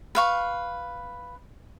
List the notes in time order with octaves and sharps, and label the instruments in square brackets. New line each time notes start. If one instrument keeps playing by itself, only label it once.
[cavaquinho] B4 F5 C#6